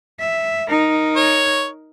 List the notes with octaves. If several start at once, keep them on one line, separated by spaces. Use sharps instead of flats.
E5
D#4 A#4
C#5